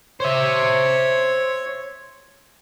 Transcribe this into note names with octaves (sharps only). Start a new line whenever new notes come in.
C5 C#5 E5